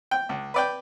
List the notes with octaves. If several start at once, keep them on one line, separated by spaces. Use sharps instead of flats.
G5
C#2
B4 D5 G5